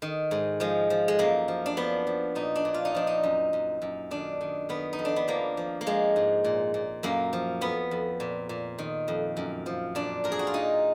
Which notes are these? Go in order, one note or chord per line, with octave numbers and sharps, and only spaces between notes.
D#3
G#2
F3 G#3
F3
G#3
F#2 A#3
F3
D4
F3 B3
F3
A#2 D#4
D4
A#2
F4
D#4
F3 D4
D#4
F#2
F#2
F#2
D#3 D4
D#3
D#3 B3
D#4
F2
D4
B3
F3 A#3
F3
A#3
F3 G#3
G#2
A#2
A#2
F#2 A#3
F3
F2 B3
F2
A#2
A#2
D#3
F2
F#2
F3
A#2 D4
A#2 A#4
G#4
F#4
F4
A#2 D#4